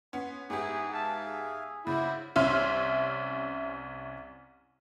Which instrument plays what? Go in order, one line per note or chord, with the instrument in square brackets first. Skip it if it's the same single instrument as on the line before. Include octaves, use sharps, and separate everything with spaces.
[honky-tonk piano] B3 C#4 [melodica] C6
[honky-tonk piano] G#2 B3 G4 [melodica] E4 G#5 [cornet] G#4
[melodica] E5 F5 G#5 [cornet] A5
[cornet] G#4
[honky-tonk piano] C#3 [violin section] E4 [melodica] F#4 C5 D5
[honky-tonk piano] C2 C#4 E5 C6 F6